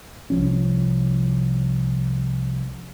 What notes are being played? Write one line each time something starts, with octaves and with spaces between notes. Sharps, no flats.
C2 F3 C#4